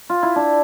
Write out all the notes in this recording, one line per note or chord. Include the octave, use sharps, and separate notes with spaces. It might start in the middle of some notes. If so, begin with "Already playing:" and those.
F4
E4
D4